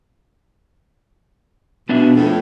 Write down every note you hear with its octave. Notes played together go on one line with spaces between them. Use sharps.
B2 B3 D4 E5
F2 A2